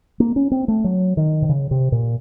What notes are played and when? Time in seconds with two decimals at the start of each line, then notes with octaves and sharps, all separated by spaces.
0.20 A#3
0.36 C#4
0.52 C4
0.68 A3
0.84 F#3
1.17 D#3
1.42 C3
1.49 C#3
1.71 C3
1.92 A#2